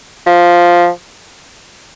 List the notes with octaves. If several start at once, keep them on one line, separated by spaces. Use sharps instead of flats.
F3